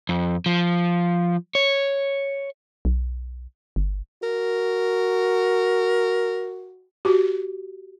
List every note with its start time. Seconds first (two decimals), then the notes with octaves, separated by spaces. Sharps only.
0.09 F2
0.46 F3
1.55 C#5
2.85 B1
3.76 G1
4.23 F#4 A#4
7.05 F#4 G4